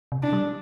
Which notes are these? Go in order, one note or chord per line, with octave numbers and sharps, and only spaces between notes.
C3
D4
G3